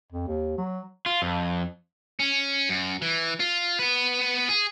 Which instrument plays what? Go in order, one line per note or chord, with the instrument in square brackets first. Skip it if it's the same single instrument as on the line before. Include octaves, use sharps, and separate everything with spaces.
[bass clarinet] F2
D#2
F#3
[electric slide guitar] F4
F2
[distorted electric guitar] C#4
F#2
E3
F4
B3 B4
G#4